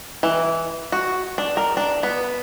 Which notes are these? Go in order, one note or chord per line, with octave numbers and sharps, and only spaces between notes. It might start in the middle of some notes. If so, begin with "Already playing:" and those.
E3
F#4
D4
A#4
D4
B3